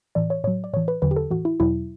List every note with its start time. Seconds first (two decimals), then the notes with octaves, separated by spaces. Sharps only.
0.15 A2 E3 D5
0.30 C#5
0.44 A2 F#3 C#5
0.64 D5
0.73 A2 E3 C#5
0.88 B4
1.02 E2 D3 F#3 B4
1.11 G4
1.17 A4
1.31 A2 E3 F#4
1.45 E4
1.60 E2 B2 F#3 E4